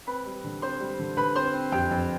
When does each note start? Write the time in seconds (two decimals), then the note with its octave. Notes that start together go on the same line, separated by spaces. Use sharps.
0.07 C4 B4 B5
0.26 G3
0.44 D3
0.62 C4 C5 C6
0.80 G3
0.99 D3
1.17 D3 B4 B5
1.35 C4 C5 C6
1.54 C4
1.72 F2 G4 G5
1.91 F2